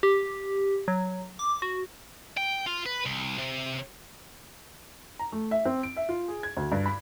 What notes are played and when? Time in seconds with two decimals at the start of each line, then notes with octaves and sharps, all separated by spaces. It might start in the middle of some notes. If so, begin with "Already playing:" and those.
0.03 G4
0.88 F#3
1.39 D6
1.62 F#4
2.37 G5
2.67 F4
2.86 B4
3.06 C2
3.38 C3
5.19 A#5
5.32 A3
5.51 E5
5.65 C4
5.83 D7
5.97 E5
6.09 F4
6.28 G#4
6.43 G#6
6.57 D2
6.72 G2
6.86 B5